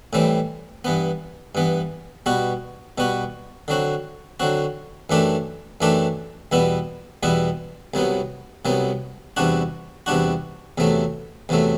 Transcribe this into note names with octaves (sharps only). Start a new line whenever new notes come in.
A2 E3 G3 C4
G2 E3 B3
G2 E3 B3
B2 G3 B3 F#4
B2 G3 B3 F#4
D3 F#3 C4 F#4
D3 F#3 C4 F#4
F#2 E3 A3 D4 G4
F#2 E3 A3 D4 G4
E2 B2 G3 B3 E4
E2 B2 G3 B3 E4
C2 C3 F#3 B3
C2 C3 F#3 B3
E2 C3 G3 D4 F#4
E2 C3 G3 D4 F#4
E2 C3 F#3 A3
E2 C3 F#3 A3